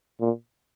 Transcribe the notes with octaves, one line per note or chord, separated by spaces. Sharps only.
A#2